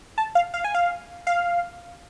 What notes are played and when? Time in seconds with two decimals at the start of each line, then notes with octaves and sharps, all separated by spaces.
0.18 A5
0.35 F5
0.54 F5
0.64 G#5
0.75 F5
1.27 F5